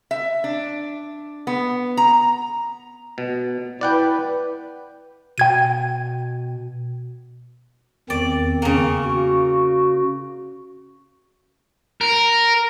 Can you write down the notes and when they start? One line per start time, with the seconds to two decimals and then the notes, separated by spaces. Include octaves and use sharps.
0.11 E5
0.44 D4
1.47 B3
1.97 A#5
3.18 B2
3.81 E4 B4 D5 F#5 G5
5.38 B2 G5 G#6 D#7
8.10 E2 D#3 C4 D5
8.62 C#3 A#3
9.04 F#4
12.01 A#4